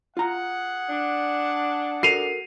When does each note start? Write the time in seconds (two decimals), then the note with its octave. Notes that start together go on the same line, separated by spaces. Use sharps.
0.17 F4 G#4 F#5 A#5
0.89 D4
2.03 F#4 A4 A#4 C7 D#7 F7